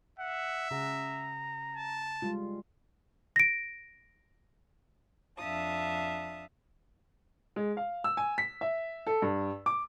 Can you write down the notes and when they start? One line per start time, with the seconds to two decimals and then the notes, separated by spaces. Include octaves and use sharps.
0.19 E5 F#5
0.71 C#3 G#4 F#5 A#5
1.76 A5
2.22 G3 G#3 F4
3.36 A#6 D7
5.37 F2 D4 E5 F5 A5 D#6
7.56 G#3
7.77 F5
8.04 E6
8.17 G#5
8.38 B6
8.61 E5
9.07 A4
9.22 G2
9.66 D6